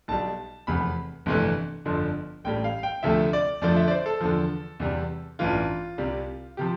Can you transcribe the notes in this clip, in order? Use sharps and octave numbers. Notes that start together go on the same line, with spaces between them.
B1 B2 G3 A5
F1 E2 C3 B5
G1 F2 C3 E3 A3
G1 F2 D3 F3
A1 A2 G3 G5
F5
G5
D2 C3 F3 A3 E5
D5
F2 D3 F3 A3 D5
E5
D5
C5
A4
E2 D3 F3
E2 C3 G3
A1 G2 E3 F4
C2 C3 G3
C3 F3 G4